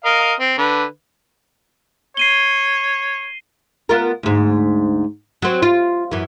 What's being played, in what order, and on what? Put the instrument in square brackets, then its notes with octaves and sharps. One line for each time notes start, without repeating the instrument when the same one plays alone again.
[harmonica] A#4 D#5 F5
C4
D3 B4
[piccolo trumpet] C#5 [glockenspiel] C7 D#7 G7
[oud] B3 F4 A#4
D2 G#2
F#3 C4
F4
F#2 E3